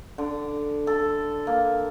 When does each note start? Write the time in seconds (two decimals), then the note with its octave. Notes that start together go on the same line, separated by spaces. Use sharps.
0.18 D3
0.87 A4
1.47 A#3